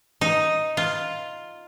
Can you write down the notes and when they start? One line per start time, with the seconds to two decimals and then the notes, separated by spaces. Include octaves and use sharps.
0.21 D#4
0.77 F4